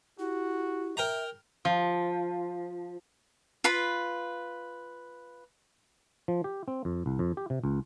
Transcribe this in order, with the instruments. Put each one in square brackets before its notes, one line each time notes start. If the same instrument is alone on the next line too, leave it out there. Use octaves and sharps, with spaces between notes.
[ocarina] E4 [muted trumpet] F#4 [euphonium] G4
[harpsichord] A#4 G5 A#5 [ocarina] E5
[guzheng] F3
[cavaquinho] F4 B4 B5
[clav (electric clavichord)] F3
G4
C4
F2
C2
F2
G4
C3
C#2